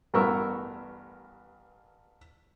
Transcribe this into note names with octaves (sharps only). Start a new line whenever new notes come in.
A1 G2 B3 A#4 C#6 E6